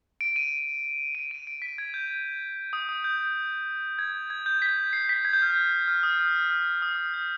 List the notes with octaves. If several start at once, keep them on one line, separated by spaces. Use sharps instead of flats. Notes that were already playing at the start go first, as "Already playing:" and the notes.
D7
D#7
D7
D#7
D7
B6
G#6
G6
D#6
D#6
G6
G#6
G#6
G6
B6
C7
B6
G#6
G6
F6
G6
F6
D#6
F6
F6
D#6
F6
G6